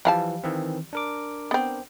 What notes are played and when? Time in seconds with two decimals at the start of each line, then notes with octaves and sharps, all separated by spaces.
0.05 E3 F3 G3 F5 A5
0.44 D#3 E3 C4
0.93 D4 A#4 D6
1.51 B3 C4